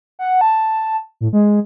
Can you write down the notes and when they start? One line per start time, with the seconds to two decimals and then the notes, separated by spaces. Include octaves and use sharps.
0.19 F#5
0.41 A5
1.21 A2
1.33 G#3